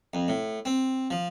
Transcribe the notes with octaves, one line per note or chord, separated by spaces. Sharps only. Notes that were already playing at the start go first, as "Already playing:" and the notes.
F2
A2
C4
F3